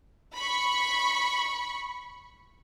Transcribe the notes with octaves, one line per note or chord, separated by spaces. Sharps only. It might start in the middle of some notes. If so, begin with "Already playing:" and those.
B5 C#6